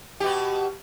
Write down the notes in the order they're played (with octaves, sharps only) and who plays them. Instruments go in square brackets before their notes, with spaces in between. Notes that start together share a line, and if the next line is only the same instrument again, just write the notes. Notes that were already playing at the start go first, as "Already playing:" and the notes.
[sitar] B2 G4